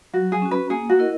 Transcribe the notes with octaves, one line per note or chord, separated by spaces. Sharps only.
F#3 F#4
G#4
C#4 F#4
B4
A#3 G#4
F#4
E4 A#4 D#5